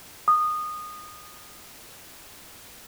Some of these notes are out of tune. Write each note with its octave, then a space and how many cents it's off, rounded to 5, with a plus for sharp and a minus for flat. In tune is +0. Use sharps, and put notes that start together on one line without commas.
D#6 -20